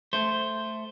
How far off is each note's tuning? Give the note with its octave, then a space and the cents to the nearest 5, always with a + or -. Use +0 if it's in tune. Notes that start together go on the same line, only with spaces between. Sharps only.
A3 +0 C5 +0